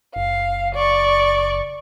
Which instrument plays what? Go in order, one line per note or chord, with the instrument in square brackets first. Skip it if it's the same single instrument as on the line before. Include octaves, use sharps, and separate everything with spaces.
[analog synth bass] F#1 [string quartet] F5
[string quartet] D5 C#6